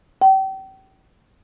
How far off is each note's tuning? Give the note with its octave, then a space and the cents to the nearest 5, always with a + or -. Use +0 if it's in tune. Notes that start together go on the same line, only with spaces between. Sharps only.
G5 -35